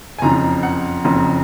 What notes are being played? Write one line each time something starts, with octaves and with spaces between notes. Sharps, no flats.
G#5
F#1 F2 C#3 F3 A#5
F#5
F#1 F2 C#3 F3